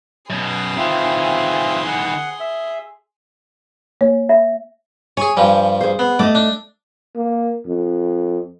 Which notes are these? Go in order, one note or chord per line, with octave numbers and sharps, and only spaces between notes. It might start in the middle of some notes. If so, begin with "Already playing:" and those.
F#2 B2 G#4 C6
D#3 E3 C4 F4 E5
F#5
E5
A#3 C#5
E5
G#4 C#5 G#5
G2 F3 G3
G#4 C5
B3
A3 D5 D#5
D4
A#3
F2